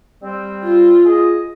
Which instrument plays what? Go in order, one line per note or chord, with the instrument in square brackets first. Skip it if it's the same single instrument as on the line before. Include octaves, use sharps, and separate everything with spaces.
[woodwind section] G3 C4
[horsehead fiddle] F4
[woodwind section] G#4 D#5